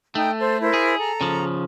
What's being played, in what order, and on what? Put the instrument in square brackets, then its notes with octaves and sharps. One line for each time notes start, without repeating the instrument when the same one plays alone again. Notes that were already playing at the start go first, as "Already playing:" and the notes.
[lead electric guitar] A3 [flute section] D#4 G5 D#6
[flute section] A4 C5
E4 A#4 C5
[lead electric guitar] G#4
[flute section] A4 A#5
[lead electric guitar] C#3 F3